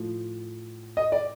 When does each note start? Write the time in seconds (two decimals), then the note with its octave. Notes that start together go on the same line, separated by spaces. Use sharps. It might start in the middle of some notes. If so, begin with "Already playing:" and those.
Already playing: A2 F3
0.97 D#5
1.12 D5